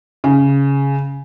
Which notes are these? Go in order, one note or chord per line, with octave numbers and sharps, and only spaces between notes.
C#3